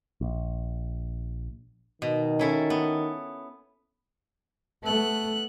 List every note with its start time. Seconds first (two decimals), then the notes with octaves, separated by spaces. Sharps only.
0.21 A#1
2.02 B2 D#3
2.39 C#4 E4 A4
2.70 B3
4.83 A3 B3 F#6